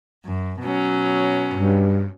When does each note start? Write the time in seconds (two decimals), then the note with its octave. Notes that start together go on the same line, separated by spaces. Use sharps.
0.24 F#2
0.62 B2 F#3 C#4
1.54 G2